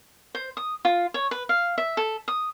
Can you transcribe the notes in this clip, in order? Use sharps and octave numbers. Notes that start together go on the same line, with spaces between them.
C5
D#6
F4
C#5
B4
F5
E5
A4
D#6